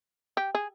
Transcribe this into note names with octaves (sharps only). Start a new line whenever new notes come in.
G4
G#4